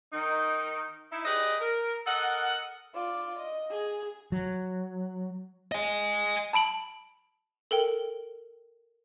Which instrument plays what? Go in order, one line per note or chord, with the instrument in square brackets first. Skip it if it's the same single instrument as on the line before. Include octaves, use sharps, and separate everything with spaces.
[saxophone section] D#3 D#4
D#4 E4
G4 G#4 B4 D5 D#5
A#4
A4 A#4 D#5 F#5
[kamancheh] F4 D5
D#5
G#4
[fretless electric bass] F#3
[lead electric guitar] D#5 G#5
[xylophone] A5 B5 D7 F#7
A4 A#4 G5